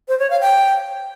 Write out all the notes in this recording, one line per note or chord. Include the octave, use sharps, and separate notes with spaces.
C5
C#5
F5
G5